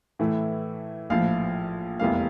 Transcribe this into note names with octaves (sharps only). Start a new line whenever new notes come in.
A2 E3 A3 E4
A#1 A2 F3 F5
F1 E2 E3 G3 A#3 F5